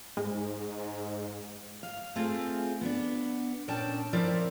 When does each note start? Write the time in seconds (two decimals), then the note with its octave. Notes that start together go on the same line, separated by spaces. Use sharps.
0.17 G#2 G#3
1.83 F5
2.16 A3 C4 F4 G#4
2.81 B3 D4
3.68 A#2 C#4 D4 G5 A5
4.13 F3 C4 E4 A#4 D5